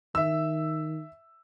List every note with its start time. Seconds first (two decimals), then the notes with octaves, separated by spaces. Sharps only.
0.15 D#3 E5 E6